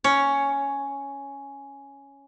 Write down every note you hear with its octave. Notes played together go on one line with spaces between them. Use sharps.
C#4 C#5